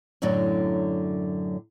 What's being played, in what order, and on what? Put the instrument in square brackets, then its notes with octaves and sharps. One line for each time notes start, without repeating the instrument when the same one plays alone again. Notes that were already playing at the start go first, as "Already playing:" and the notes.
[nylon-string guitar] F#2 A2 D3 F#3 D5